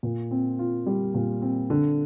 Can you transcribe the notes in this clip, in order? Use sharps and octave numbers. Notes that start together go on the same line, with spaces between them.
A#2
C4
F4
G3
A#2
C4
D3